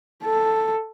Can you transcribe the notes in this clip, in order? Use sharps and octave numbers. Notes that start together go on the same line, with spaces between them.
A4